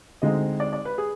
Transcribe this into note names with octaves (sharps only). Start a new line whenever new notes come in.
D2 D3 G#3 C4 D#4 D#5
D5
D5
B4
G#4